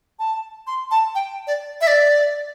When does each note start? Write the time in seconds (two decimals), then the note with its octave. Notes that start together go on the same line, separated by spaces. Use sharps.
0.19 A5
0.67 C6
0.91 A5
1.15 G5
1.47 D5
1.81 E5
1.87 D5